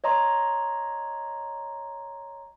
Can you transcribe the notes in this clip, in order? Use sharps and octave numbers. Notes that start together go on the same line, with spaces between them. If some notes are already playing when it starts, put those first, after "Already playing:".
C#5 D#5 A#5 C6